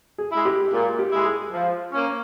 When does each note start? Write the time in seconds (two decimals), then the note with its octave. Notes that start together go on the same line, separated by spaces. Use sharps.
0.18 G#4
0.31 G#3 E4
0.45 G4
0.72 A#2 G#3
0.99 G4
1.11 G#3 E4
1.25 G#4
1.52 F3
1.92 A#3 C#4